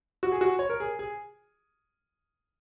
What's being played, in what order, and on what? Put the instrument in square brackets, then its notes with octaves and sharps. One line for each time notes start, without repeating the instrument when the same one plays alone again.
[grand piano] F#4
G#4
F#4
C#5
A#4
G#4
G#4